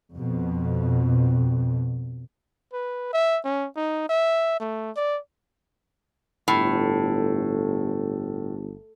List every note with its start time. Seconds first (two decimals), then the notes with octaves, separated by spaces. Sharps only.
0.14 F2 B2
2.73 B4
3.13 E5
3.45 C#4
3.77 D#4
4.09 E5
4.60 A3
4.96 D5
6.48 G1 A2